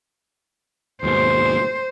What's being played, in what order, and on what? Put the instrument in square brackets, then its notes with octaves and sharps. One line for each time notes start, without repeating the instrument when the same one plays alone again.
[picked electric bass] D#2 G#2 B2 [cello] C5